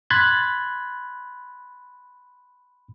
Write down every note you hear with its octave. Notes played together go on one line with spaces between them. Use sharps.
B5 C6 F#6 G#6 A6